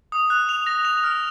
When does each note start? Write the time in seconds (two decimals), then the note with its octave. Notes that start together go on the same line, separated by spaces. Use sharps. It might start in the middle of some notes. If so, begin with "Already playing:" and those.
0.12 D#6
0.30 F#6
0.49 F7
0.67 A#6
0.85 F7
1.04 F6